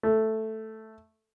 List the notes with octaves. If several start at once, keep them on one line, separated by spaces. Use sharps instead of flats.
A3